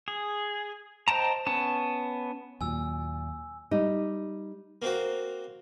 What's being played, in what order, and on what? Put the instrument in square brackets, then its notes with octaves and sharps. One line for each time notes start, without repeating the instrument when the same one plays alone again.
[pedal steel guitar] G#4
C5 D#5 G5 A5 A#5
B3 C#4 A5
[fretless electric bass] D#2 F#3 [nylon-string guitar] A#2 [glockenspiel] G#5 E6
[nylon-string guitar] G3 D#4
[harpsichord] A#3 C4 F#4